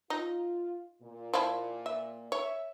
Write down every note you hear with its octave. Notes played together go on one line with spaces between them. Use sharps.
D#4 F4
A#2
F3 E4
E5
C#5 E5